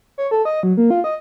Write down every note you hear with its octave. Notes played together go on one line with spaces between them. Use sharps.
C#5
A4
D#5
F#3
A#3
F4
D#5